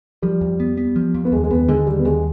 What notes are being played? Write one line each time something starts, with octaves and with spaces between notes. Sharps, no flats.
F3 G3
F2
B3
B3
F3
F2
B3
D#2 G#3
G#3
D#2 B3
D3 G#3
D#2 G3
B3
D#2 G#3